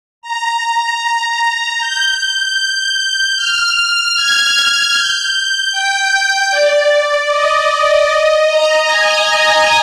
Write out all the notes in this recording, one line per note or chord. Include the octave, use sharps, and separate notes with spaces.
A#5
G6
G6
F6
F6
G#6
G#6
G6
G5
D5
D#5
D#5
A#5
G#5